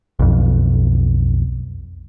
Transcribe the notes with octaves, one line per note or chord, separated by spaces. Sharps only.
B1 F2